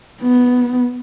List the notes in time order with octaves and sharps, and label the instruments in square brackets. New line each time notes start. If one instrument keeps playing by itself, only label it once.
[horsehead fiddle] B3